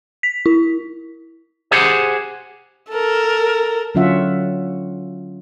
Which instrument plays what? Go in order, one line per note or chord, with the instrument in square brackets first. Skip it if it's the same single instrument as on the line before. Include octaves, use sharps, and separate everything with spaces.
[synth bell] B6
E4
[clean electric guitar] G4 G#4 C5 F#5
[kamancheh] A4 A#4
[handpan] D3 F#3 C#4 F4 E5 F#5